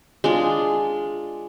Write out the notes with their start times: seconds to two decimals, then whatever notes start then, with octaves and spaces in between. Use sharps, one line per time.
0.24 G#3 D4 F4